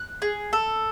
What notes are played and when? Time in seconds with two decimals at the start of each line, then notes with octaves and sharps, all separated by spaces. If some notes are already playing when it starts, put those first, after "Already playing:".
Already playing: F#6
0.22 G#4
0.53 A4